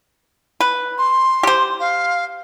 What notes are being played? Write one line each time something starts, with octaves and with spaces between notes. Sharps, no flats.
B4
C6
G4 C5
F5